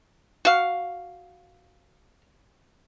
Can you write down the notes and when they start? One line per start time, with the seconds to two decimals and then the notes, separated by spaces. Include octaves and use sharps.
0.45 F#4 F5